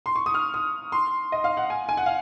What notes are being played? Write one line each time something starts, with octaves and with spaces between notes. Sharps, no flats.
C6
C#6
D#6
F6
D#6
C6
D#5
F5
F#5
G#5
G#5
F#5
F5